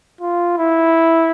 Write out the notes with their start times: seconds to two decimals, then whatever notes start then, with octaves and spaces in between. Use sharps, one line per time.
0.21 F4
0.57 E4